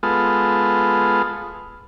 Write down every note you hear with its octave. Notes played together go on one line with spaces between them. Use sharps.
G#3 B3 F4 A4